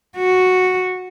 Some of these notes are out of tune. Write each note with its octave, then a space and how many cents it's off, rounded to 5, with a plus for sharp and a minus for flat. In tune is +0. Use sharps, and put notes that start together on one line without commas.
F#4 -5